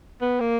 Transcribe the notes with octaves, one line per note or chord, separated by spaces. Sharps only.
B3
A#3